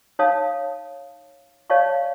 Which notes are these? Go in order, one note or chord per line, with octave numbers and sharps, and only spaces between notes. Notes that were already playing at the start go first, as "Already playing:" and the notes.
D#4 C#5 F5 A5 D#6
C#5 D5 F5 A5 C#6